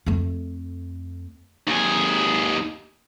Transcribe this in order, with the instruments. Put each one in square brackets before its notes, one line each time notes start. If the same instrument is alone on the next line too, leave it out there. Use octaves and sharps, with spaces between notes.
[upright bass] F2 A3
[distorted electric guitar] D#2 G#4